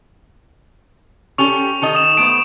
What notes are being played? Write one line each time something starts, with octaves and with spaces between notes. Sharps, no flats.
C#4 G4 A4 C#6 F7
D#3 A4 D#5
D#6 E7
A3 B3 C5 D7